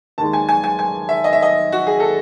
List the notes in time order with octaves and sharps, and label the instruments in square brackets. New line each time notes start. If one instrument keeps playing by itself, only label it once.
[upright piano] D#2 D#3 G#3 A5
G#5
G#5
G#5
G#5
E5
D#5
E5
D#5
F#4
G#4
A4